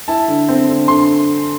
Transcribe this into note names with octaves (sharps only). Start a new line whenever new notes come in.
E4 A5
D3
C4
D3
D3 C6